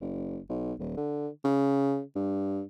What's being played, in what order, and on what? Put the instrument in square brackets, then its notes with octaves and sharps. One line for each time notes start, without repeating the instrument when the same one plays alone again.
[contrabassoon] F#1
B1
D#1
D3
C#3
G2